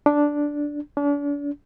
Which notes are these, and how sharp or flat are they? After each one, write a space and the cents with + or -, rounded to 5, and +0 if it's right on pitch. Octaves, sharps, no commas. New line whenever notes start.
D4 -5
D4 -40